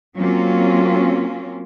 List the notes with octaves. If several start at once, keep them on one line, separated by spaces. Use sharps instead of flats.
F#3 A#3 C4 C#4 F4